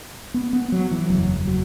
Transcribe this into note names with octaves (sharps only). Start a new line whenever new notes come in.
B3
B3
F#3
E3
F#1 E2 C#3 F#3
F#3